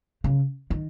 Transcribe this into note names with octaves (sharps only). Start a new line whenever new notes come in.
C#3
D#3